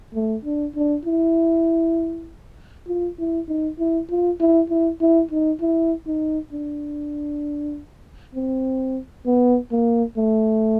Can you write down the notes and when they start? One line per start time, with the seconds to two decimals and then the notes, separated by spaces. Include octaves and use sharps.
0.15 A3
0.45 D4
0.76 D4
1.06 E4
2.88 F4
3.19 E4
3.49 D#4
3.80 E4
4.10 F4
4.41 E4
4.70 E4
5.02 E4
5.31 D#4
5.61 E4
6.07 D#4
6.53 D4
8.35 C4
9.26 B3
9.72 A#3
10.18 A3